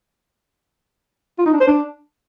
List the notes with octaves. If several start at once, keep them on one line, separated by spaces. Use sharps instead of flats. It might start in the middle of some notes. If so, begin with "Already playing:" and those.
F4
D#4
D4
C5
D4